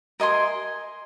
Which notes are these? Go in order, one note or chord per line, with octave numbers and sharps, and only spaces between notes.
A#4 D#5 G#5 C6